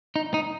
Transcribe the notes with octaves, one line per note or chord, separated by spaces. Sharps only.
D#4
D#4